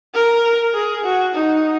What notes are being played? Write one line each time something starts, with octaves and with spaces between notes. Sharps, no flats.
A#4
G#4
F#4
D#4